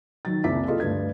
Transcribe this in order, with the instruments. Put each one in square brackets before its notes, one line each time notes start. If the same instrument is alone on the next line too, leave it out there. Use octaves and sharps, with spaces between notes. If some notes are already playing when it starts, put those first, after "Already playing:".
[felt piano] D#3 F#3 A6
F#1 C2 C3 E5 D6 B6
E4 F4 G4 A4 D#5
D2 G2 B4 G#6